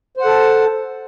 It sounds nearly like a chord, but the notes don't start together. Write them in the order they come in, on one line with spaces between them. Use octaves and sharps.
C5 F#5 A4 A5